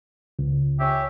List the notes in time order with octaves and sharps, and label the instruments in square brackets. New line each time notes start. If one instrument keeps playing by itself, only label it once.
[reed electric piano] C#2
[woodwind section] C#4 G4 E5